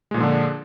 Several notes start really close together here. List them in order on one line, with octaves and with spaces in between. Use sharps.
G#3 A#2 F3 D3 D4